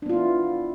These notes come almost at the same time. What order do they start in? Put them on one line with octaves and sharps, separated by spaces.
D4 B3 F4 E4